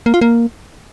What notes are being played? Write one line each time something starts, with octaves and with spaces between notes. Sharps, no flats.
A#3
F4
A#3